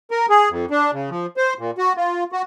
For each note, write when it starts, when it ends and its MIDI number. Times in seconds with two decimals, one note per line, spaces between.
0.11 0.26 70
0.29 0.49 68
0.50 0.65 41
0.71 0.91 62
0.93 1.10 49
1.10 1.26 53
1.37 1.53 72
1.58 1.71 46
1.78 1.93 66
1.97 2.24 65
2.32 2.42 66